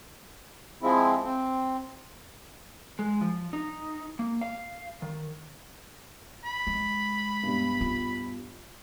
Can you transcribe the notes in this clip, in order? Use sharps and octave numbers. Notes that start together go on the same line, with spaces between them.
F3 G#3 C4 E4
C4
G#3
F3
D#4
A#3
F5
D#3
B5
G#3
G2 B2 G3
F4